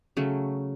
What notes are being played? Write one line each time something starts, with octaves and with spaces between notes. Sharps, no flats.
C#3 F#3 A3